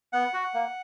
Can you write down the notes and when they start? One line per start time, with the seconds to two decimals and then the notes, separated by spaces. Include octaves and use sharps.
0.13 B3 F#5
0.33 F#4
0.54 A#3